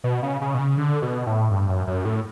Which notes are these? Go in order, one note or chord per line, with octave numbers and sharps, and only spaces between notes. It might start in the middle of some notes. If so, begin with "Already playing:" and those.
B2
C#3
C#3
B2
C#3
D3
B2
A2
G2
F#2
F#2
A2